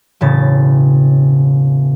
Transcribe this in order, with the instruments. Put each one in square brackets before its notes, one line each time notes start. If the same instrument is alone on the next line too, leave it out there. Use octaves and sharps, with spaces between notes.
[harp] E1 A2 C#3 A6